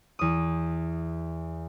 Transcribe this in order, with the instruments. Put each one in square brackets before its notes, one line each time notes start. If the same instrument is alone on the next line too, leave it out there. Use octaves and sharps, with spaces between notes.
[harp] E2 D#6